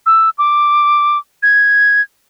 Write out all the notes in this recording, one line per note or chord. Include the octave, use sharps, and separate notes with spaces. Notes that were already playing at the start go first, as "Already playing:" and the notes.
E6
D6
G#6